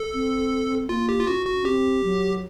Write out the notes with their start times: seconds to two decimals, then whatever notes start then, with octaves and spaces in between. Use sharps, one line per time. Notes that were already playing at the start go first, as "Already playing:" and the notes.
Already playing: A4
0.14 C4
0.89 A#3 F4
1.09 G4
1.20 F4
1.27 C#4 F#4
1.46 F#4
1.65 C4 G4
2.04 F#3